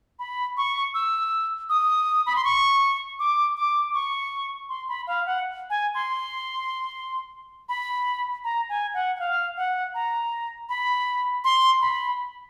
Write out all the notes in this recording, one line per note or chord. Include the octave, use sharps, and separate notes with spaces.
B5
C#6
E6
D#6
B5
C6
C#6
D6
D6
C#6
C6
B5
F5
F#5
G#5
C6
B5
A#5
G#5
F#5
F#5
F5
F#5
A#5
B5
C6
B5